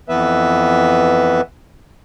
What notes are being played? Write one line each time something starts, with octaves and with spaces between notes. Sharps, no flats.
F2 E3 B3 B4 E5